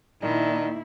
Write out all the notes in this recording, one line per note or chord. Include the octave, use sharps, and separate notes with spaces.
A#2 D#3 A#3 D4 E4